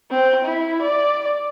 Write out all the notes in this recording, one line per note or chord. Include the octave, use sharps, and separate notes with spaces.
C4
E4
D5